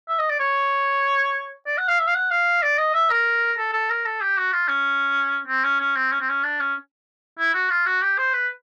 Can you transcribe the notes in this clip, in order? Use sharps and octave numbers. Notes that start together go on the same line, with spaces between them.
E5
D#5
D5
C#5
D5
F#5
F5
E5
F5
F#5
F5
D5
D#5
E5
A#4
A4
A4
A#4
A4
G4
F#4
F4
C#4
C4
C#4
C#4
C4
C#4
C4
C#4
D4
C#4
E4
F#4
F4
F#4
G4
C5
B4